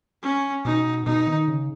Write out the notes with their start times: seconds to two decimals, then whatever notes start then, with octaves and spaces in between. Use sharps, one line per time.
0.23 C#4
0.65 B2 D#4
1.06 B2 D#4
1.27 D#3
1.48 C#3